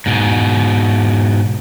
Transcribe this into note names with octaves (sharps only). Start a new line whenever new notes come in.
G#2 B2